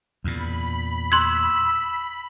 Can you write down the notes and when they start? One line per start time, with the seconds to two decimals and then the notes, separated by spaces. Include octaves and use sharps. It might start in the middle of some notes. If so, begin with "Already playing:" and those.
0.24 E2 A#2 B5
1.12 C6 E6 F#6 G#6